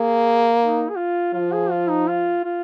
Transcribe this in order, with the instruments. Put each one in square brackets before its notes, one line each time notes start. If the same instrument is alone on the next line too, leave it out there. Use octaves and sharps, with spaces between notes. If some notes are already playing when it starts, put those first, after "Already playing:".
Already playing: [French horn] A#3 [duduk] G#4
[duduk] D#4
G#4
F4
[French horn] F3 [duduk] F4
[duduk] G#4
F4
D#4
F4
F4